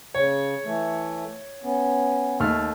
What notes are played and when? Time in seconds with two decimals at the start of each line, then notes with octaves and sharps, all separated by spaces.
0.15 C#3 C#5
0.64 E3 A3
1.63 B3 C#4
2.40 D#2 A3 F6